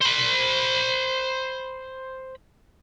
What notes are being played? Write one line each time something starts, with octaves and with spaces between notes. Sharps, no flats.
C5 B5